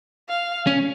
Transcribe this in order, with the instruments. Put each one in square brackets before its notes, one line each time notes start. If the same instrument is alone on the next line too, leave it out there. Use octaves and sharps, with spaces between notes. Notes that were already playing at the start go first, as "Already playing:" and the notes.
[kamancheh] F5
[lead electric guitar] C#4